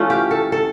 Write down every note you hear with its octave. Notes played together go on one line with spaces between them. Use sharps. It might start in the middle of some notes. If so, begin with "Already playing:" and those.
Already playing: E3 A3 C#4 F4
G4
A4
A4